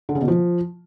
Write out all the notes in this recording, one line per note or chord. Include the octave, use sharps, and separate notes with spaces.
D3
C#3
B2
F3